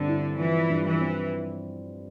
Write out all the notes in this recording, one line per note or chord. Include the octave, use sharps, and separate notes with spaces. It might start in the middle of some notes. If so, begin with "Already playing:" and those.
Already playing: G2 D3 C4
E4
E3 F3
G2
E3
C4